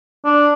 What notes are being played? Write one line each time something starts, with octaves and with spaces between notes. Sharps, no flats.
D4